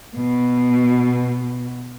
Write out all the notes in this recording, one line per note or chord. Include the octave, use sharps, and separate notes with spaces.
B2